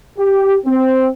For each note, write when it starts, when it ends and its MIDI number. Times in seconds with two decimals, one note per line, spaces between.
0.18 0.56 67
0.66 1.07 60